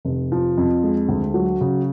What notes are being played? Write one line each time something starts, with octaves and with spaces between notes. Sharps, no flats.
F1
F3
F2
G#3
D2
F#3
C#3